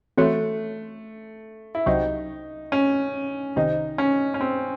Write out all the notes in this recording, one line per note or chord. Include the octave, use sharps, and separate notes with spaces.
E3 A3 C4 F#4 C#5
E4
C2 C3 F#3 D#4
C#4
C2 C3 D#3 D#4
C#4
C#4
C4